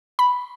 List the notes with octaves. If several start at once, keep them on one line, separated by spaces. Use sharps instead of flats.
B5